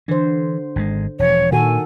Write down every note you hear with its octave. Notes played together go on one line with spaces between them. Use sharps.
D3 E3 C5
G#1 C3 G#3
E1 F3 C#5
A#2 D#3 F#4 A4 G#5